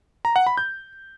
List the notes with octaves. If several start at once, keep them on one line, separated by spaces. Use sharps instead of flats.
A#5
F#5
B5
G6